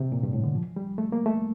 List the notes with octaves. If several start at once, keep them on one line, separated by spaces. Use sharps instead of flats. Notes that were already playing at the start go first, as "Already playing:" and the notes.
Already playing: C3
A#2
G2
A2
D3
F3
G3
A3
A#3
A3